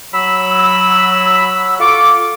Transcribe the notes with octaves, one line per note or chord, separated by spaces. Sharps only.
F#3 B5 E6
F4 A4 C#6 D6